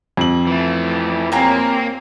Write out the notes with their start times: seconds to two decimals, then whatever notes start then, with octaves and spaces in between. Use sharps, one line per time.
0.17 F2 F#7
0.47 E3 A3
1.32 A#3 C4 G4 C#5 G#5 A#5